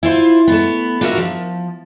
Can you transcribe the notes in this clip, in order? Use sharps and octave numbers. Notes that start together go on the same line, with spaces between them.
E4 F4 C5
A3 B3
D4 F4 F#4 A#4 E5
F3